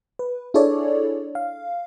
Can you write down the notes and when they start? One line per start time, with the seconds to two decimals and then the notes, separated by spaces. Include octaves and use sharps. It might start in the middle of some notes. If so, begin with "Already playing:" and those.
0.19 B4
0.54 D4 E4 G#4 A4 C#5 D5
1.35 F5